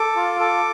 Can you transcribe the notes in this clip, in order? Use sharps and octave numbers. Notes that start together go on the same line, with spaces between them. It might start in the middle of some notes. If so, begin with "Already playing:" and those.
Already playing: A4 D6
F4
A4 D6